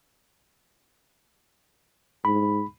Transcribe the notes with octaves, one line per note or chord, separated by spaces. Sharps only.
G#2 B5